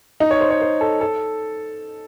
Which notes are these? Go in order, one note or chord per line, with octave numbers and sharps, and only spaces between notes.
D#4
C#5
C5
C#5
C5
A4
A4